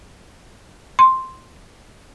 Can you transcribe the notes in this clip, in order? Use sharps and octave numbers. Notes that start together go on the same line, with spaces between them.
C6